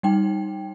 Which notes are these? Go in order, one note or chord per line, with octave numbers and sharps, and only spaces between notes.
G3 D#4 G5